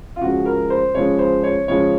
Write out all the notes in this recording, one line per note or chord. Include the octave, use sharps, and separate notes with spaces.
F4
C#3 F3 G#3 F#4
A#4
C5
C#3 F3 G#3 C#5
C5
C#5
C#3 F3 G#3 C#5